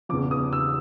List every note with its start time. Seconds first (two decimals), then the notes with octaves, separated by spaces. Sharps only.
0.09 E2 C#3 F3 D6
0.31 D#6
0.53 E6